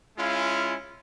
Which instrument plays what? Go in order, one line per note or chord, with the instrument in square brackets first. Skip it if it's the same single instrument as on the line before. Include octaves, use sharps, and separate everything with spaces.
[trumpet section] G#3 C#4 E4 F4 F5